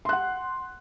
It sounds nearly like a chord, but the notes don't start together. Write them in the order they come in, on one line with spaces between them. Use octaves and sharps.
C6 F#6 F#5